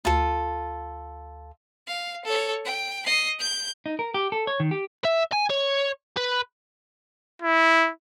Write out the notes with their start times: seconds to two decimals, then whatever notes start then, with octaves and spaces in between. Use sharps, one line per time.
0.05 D2 F4 A4
1.87 F5
2.25 A4 C#5
2.65 G5
3.06 D#5 C7
3.39 G6
3.86 D#4
3.99 A#4
4.14 G4
4.32 A4
4.47 C#5
4.60 D#3
4.71 G4
5.04 E5
5.32 G#5
5.50 C#5
6.17 B4
7.42 E4